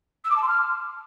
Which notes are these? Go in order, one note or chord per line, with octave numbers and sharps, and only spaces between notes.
E6
D6
A5
C6
F6